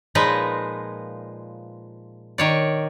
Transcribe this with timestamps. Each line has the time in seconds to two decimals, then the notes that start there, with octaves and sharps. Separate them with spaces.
0.15 A#2 F3 G#3 D#4 B4 D#5
2.38 D#3 C#5 D5